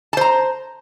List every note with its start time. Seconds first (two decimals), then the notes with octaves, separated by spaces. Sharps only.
0.13 A5
0.17 C5
0.21 A#5